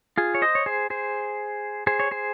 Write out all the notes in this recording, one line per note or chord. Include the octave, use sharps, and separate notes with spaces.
F4 G#4
C#5
C5 D#5
C#5
G#4 C5
G#4 C5
G#4 C5
C#5
G#4 C5